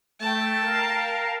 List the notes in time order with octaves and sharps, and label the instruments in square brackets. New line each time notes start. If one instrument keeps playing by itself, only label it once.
[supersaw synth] A3 [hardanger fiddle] G5 A5
[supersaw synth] A#4 F5